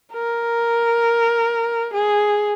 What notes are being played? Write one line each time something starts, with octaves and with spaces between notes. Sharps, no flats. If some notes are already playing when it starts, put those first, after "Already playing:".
A#4
G#4